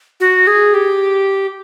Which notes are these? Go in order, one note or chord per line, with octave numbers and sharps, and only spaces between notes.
F#4
G#4
G4